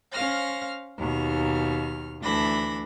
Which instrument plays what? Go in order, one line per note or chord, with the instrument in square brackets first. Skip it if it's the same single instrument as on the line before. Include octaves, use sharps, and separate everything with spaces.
[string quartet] C#4 C5 F5 F6 A#6
D#2 B2 F6
D2 E3 D4 B5 A#6